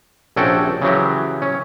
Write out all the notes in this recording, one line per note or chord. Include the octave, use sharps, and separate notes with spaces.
A#1 C3 C#4 F#4 A4 G5
C#3 E3 F#3 G4
C#4